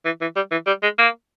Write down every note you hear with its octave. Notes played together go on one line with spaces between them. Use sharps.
E3
E3
G3
E3
G3
G#3
A#3